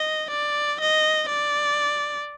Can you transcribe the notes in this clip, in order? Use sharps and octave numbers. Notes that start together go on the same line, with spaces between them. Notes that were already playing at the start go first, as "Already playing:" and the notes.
Already playing: D#5
D5
D#5
D5